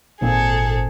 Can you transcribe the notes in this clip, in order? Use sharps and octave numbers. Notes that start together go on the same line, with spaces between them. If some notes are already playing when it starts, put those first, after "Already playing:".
G#1 A#2 C4 G#4 A4